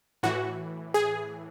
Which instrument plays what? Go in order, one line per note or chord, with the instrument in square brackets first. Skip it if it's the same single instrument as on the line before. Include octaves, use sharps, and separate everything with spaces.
[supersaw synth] A2 E3 F#4
G#4